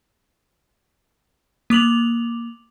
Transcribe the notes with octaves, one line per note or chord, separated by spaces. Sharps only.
A#3 D6 F7 F#7